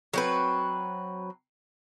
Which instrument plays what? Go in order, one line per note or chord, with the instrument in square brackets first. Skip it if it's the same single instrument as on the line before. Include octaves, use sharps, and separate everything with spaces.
[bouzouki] F#3 C4 B4